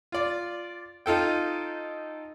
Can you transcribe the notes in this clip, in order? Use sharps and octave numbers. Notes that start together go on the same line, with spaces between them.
F4 D5
D#4 F4 A4 G5